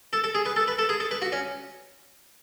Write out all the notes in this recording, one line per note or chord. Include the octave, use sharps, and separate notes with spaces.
A4
A4
G#4
B4
A4
B4
A4
G#4
A4
B4
F#4
C#4